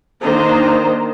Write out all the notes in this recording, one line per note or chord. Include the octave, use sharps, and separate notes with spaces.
D#3 A#3 D4 C5 D#5 A#5